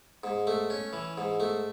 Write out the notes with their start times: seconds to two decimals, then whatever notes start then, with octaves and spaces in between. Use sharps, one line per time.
0.24 G#2
0.47 A3
0.70 C#4
0.93 E3
1.18 G#2
1.40 A3